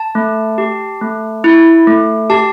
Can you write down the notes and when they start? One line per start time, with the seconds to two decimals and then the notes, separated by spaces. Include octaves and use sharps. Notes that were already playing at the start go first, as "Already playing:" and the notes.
Already playing: A5
0.15 A3
0.58 G4
1.02 A3
1.44 E4
1.87 A3
2.30 G4 A5